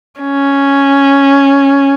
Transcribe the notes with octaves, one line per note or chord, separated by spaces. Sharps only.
C#4